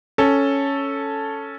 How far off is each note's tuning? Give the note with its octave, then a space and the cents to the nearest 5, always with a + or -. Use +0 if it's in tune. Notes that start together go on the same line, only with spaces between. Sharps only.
C#4 +0 A4 +0